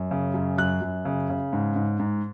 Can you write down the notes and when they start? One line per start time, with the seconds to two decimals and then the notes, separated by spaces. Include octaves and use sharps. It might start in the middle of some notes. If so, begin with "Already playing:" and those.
Already playing: F#2
0.11 C#3
0.34 F#2
0.58 F#2 F#6
0.82 F#2
1.05 C#3
1.30 C#3
1.53 G#2
1.76 G#2
2.00 G#2